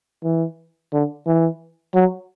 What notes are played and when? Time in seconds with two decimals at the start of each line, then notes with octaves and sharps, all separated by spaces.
0.24 E3
0.93 D3
1.27 E3
1.94 F#3